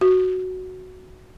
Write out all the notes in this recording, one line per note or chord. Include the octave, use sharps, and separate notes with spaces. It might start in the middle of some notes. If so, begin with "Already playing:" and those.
F#4